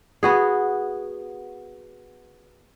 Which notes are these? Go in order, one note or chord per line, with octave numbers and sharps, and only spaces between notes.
B3 F#4 G#4